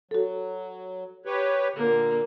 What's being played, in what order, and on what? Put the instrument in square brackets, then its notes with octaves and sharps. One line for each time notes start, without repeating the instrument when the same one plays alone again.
[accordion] F#3 [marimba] F#4 A4
[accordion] G4 B4 C#5
[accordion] A#2 D3 [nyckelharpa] A#3